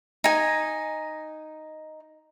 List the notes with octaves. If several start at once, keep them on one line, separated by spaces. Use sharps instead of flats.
D#4 G#5